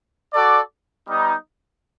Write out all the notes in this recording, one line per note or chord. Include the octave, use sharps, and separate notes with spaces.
F#4 A4 D5
G3 B3 D#4